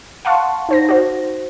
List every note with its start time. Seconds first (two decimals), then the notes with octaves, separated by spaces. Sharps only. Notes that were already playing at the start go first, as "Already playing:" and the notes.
0.25 F5 F#5 A5 C6 C#6
0.69 D#4 C5 A#6
0.89 F#4 C5